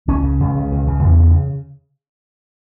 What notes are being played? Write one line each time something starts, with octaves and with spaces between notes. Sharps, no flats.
C#2 C#4
C#3
C#2
C#3
C#2
C#3
E2
C#3